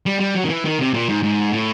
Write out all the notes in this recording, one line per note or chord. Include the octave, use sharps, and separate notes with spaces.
G3
G3
F#3
D#3
E3
D#3
C3
A#2
G#2
G#2
A2